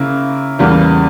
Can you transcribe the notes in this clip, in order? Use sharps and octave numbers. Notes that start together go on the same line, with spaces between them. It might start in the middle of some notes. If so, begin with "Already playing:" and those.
Already playing: C#3 A#3 E4
E2 C#3 E3 G3 A#3